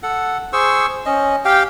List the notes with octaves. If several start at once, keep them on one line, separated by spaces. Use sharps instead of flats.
A4 F#5
G#4 C5 C#6 E6
C#4 D#5
G4 F5 G5